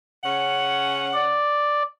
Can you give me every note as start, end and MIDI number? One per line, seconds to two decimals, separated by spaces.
0.24 1.41 49
0.24 1.41 61
0.24 1.41 78
1.14 1.83 74